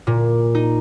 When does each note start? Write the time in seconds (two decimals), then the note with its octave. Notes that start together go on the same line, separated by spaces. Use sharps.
0.07 A#2
0.55 D#4